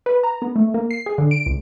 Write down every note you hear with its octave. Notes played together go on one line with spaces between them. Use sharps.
B4
A#5
B3
A3
A#3
C7
G#4
D3
D7
C#2